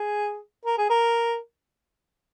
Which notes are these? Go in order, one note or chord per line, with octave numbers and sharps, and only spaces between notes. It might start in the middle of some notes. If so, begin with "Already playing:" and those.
Already playing: G#4
A#4
G#4
A#4